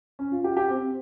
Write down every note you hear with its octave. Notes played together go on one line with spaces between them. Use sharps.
C#4
F4
G4
G4
C4